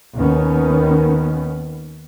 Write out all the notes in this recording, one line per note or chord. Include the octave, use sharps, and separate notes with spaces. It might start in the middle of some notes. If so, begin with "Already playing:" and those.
D#2 D#3 B3 C#4